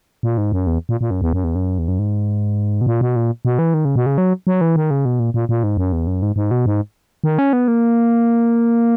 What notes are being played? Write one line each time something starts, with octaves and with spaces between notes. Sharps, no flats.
A#2
G#2
F#2
E2
A#2
A#2
F#2
E2
F#2
E2
F#2
E2
F#2
G#2
B2
A#2
B2
A#2
B2
E3
D#3
C#3
B2
C#3
F#3
F#3
E3
D#3
C#3
B2
A#2
A#2
A#2
G#2
F#2
E2
F#2
G#2
G#2
B2
G#2
D#3
C#4
B3
A#3